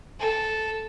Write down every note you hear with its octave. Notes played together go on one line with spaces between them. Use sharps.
A4